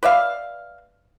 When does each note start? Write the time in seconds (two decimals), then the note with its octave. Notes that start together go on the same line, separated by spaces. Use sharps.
0.03 B4 D5 E5 F5